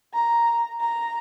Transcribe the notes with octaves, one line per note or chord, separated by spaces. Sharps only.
A#5
A#5